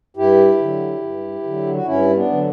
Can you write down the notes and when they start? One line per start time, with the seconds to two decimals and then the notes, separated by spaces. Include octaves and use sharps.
0.17 G2 E4 G4
0.60 D3 F#3
1.02 G2
1.44 D3 F#3
1.75 F#4
1.86 G2 C#4 E4
2.10 C#4
2.15 B3 D4
2.29 D3 F#3